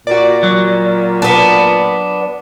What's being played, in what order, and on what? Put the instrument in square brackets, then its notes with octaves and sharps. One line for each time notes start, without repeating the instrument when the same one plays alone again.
[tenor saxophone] A#2 [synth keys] F#4 D5
[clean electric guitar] F#3
[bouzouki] B3 D4